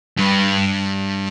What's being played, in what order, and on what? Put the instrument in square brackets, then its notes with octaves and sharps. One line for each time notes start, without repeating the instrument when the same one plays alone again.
[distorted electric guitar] G2